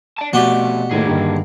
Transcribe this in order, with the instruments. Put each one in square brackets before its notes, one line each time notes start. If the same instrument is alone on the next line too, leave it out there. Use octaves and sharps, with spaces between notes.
[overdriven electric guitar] D5 A5
[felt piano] B2 [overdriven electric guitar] F3 A3 [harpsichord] F#4 G4 D5
[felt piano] A2 D#3 A3 [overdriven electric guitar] A#3 G#4
[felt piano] G2 D3 D#3